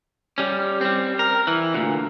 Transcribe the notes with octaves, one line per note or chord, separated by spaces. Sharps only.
G3 C#4
G3 C4
A#4
E3
D2 A#2